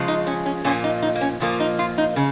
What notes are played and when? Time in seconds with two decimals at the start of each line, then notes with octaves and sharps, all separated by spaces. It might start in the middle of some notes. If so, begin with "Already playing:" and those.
Already playing: C#3 F3 G#3
0.08 D#4
0.27 C#4
0.46 C#4
0.64 A#2 F3 A#3 C#4
0.84 D#4
1.03 D#4
1.15 A#3
1.21 C#4
1.40 A#2 F3 A#3
1.60 D#4
1.79 F4
1.98 D#4
2.16 C#3